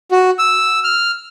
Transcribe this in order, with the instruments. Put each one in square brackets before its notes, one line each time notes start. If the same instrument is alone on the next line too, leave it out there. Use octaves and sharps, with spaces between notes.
[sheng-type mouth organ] F#4
E6
F6